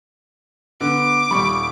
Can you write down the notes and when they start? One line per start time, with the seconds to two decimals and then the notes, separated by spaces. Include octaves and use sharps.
0.81 D3 B3 D6
1.31 D#1 G3 B5 C#6